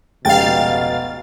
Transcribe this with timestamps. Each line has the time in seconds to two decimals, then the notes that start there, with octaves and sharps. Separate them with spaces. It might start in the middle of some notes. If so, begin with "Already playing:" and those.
0.25 F1 C#2 B2 F5 G5 A6